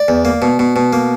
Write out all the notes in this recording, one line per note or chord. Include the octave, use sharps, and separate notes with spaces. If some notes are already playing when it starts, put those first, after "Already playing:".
Already playing: D5
E2
A#3
B2
B2
B2
A#3